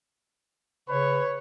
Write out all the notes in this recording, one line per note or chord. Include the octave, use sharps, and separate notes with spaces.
C#3 B4 C#5